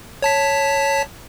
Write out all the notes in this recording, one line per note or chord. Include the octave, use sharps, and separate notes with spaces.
C#5 A5 B6